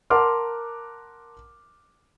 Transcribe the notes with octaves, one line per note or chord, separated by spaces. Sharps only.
A#4 F#5 A5 C6 D6 F6